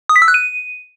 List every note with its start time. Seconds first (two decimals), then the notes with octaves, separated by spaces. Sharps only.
0.09 D#6
0.16 B6
0.22 E6
0.28 F#6
0.34 D#7